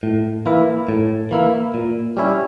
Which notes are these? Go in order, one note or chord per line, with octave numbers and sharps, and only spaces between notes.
A2
E3 A#3 E4
A2
E3 A#3 E4
A#2
G3 C#4 E4